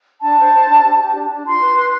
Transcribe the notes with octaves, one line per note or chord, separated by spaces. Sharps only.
D4 A5
C5
C5
D4
G4
G4
D4
D4
F4 C6
B4
B4